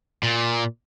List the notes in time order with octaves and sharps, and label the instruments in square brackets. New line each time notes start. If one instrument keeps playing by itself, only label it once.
[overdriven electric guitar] A#2